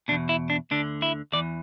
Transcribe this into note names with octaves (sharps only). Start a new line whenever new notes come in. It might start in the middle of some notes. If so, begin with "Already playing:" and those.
E2 B2 D4
E4
D4
D2 D3 D4
E4
E2 E3 D5